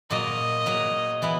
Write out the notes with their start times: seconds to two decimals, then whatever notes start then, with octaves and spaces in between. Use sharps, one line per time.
0.10 A#2 F#3 A#3 D#5
0.66 A#2 F#3 A#3
1.22 E3 B3 E4